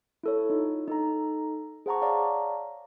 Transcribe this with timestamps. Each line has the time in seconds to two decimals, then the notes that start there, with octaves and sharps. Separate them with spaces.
0.23 E4 A4 C#5
0.50 D#4 F4
0.88 D#4 A4 A#5
1.86 G#4 C5 F#5 A5 A#5 C#6
2.02 C#5 D5 F5 A5 A#5 D6